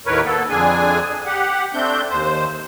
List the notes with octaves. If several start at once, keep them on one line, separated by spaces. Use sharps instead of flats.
D#2 A2 D#3 A#4 B4 C#5
A#3 B3 A4
F2 D3 D4 G#4 G#5
G4 F#5
A3 C4 D4 G6
D#2 C5